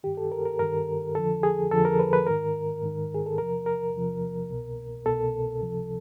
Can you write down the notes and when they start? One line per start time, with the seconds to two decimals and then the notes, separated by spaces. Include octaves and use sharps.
0.03 G2 D#3 G4
0.17 A4
0.32 A#4
0.45 A#4
0.59 G2 D#3 A#4
1.15 F2 D3 F3 A4
1.43 G#4
1.71 F2 D3 F3 A4
1.85 A#4
1.99 B4
2.13 B4
2.27 G#2 D#3 A#4
2.82 G#2 D#3
3.14 G#4
3.26 A4
3.38 E2 C3 F3 A#4
3.66 A#4
3.94 E2 C3 F3
4.50 C2 B2
5.06 C2 B2 A4
5.61 C#2 C3 F3